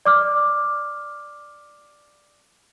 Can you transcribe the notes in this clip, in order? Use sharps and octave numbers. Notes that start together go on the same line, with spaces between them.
D5 D6 F6